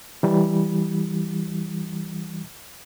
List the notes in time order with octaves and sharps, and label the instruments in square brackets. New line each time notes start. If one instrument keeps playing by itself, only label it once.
[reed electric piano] E3 G3